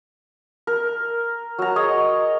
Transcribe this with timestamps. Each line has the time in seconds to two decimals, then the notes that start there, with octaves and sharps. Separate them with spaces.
0.67 A#4
1.59 F#3 A#5
1.76 G#4 C#5 D#5